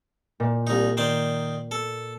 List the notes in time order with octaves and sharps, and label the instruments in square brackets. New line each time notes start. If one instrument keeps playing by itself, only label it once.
[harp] A#2
[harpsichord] C2 D#4
D#3 C5 D5
A4